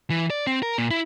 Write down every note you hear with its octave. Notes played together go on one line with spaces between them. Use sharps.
E3
D5
C4
A#4
A#2
E4